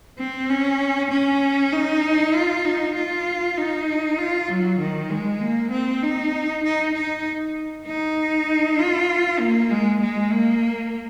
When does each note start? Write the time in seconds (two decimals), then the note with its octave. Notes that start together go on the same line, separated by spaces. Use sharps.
0.19 C4
0.50 C#4
1.11 C#4
1.72 D#4
2.34 F4
2.65 D#4
2.95 F4
3.57 D#4
4.18 F4
4.49 F#3
4.79 D#3
5.10 G#3
5.41 A#3
5.71 C4
6.03 D#4
6.64 D#4
6.95 D#4
7.86 D#4
8.78 F4
9.39 A#3
9.70 G#3
10.01 G#3
10.32 A#3